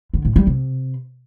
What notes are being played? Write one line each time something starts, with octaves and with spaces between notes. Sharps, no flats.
D3
A2
G3
C3